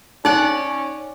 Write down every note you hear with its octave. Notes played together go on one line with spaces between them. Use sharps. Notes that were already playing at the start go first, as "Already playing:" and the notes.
C#4 D#4 D5 F#5